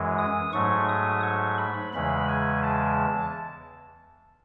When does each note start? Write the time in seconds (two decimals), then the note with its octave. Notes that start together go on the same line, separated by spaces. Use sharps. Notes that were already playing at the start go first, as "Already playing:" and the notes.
Already playing: F#2 E3 G#3
0.18 D#6
0.53 G#2 F#3 A3 C#6
0.89 D#6
1.23 C#6
1.58 B5
1.94 E2 C#3 E3 G#3 B5
2.28 G#5
2.63 A5